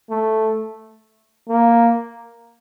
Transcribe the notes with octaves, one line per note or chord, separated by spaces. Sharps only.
A3
A#3